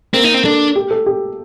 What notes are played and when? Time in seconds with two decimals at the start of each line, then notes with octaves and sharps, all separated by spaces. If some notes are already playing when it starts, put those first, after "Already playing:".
0.14 A#3 C4
0.24 D#4
0.34 C4
0.45 D4 A4
0.76 G4
0.91 A4
1.06 G4